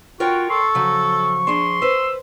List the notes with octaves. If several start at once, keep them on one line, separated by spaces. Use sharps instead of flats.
F4 F#4 A#4 C#5 G5
A4 C6 C#6
C#3 F3 F#3
D4 G#4 C6
B4 C5 E6